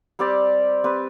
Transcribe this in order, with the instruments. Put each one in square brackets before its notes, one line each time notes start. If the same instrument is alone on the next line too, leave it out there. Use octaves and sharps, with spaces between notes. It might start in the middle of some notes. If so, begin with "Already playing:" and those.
[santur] G3 C4 G4 D5
C4 G4 B4